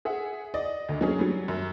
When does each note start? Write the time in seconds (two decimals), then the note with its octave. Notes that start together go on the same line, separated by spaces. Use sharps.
0.05 G#4 E5 F#5
0.54 D5 D#5
0.89 D2
1.01 F#3 C#4 G#4
1.19 F#3 G3
1.48 F#2